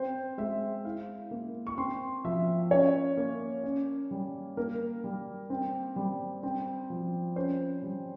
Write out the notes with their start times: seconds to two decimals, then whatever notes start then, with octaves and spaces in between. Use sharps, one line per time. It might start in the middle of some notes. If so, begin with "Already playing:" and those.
Already playing: C4 C5
0.38 G#3 E5
0.85 E4 F5
1.31 A#3
1.67 C#6
1.78 C4 C6
2.24 F3 E5
2.71 C#4 C#5
3.17 A#3
3.64 C#4
4.11 G3
4.57 A#3 A#4
5.04 G3
5.50 C4
5.96 G3
6.43 C4
6.90 F3
7.36 C#4 C5
7.83 G3